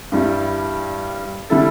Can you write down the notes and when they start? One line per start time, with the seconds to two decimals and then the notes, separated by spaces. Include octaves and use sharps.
0.12 G2 G3 E4 G4
1.50 D3 G3 E4 A4